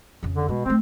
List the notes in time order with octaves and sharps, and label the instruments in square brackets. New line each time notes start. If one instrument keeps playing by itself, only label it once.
[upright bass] F2 C#3
[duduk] D3
[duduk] B2 [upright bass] G#3
[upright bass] D#3 A3 [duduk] C4